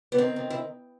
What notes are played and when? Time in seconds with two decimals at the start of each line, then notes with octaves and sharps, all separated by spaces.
0.12 B3
0.18 D#3 C4
0.36 D#3
0.50 E4